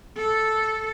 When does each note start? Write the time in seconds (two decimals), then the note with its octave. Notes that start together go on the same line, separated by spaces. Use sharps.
0.17 A4